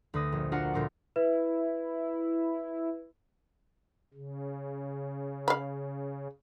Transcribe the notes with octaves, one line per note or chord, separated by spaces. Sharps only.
D2 D3 B4 D#6 A#6
A#1
D4 F4 F#4 A#4 F#5 A5
D2 A#2 A#4 C6 D6
E4 B4
C#3
F5 B5